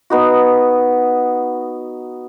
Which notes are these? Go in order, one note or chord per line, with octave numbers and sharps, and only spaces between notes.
B3 D#4 F#4